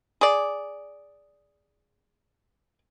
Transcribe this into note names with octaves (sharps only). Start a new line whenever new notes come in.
G#4 D5